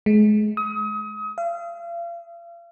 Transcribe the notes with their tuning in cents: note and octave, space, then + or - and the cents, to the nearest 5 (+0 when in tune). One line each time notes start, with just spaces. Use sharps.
G#3 +30
D#6 +35
F5 -40